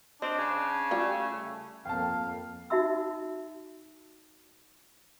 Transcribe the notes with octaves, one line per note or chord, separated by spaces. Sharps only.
C4 D4 D#5
C#3
G3 A3 F4 G4
F2 A#3 F5 G5 A5
D#4 F#4 E5 B5 E6